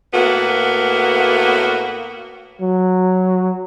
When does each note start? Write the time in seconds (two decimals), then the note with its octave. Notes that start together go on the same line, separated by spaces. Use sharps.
0.14 A2 A#3 B3 F#4
2.61 F#3